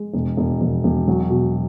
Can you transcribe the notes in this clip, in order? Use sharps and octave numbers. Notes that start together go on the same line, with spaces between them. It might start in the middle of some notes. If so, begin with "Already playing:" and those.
Already playing: G#3
E1
E1
E1
E1
F#3
B2